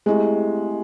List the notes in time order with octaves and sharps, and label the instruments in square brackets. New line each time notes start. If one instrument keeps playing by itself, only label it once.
[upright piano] G#3 [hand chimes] A3 C4 E4 G4